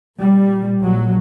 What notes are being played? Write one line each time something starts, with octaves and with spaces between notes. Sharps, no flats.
A#2 G3
A#1 F#3